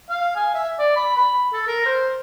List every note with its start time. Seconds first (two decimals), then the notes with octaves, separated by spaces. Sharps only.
0.09 F5
0.36 G#5
0.54 E5
0.79 D5
0.96 B5
1.16 B5
1.53 A4
1.67 A#4
1.86 C5